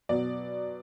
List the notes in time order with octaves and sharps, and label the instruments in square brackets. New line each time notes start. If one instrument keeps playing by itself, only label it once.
[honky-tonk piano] B2 F#3 B3 D5